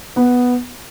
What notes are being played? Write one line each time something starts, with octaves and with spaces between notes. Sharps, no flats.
B3